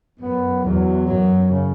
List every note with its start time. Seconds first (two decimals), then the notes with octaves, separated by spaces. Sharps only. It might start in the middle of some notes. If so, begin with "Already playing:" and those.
0.19 F#2 B3
0.63 E2 F#3
1.07 F#2 F#3
1.50 C#3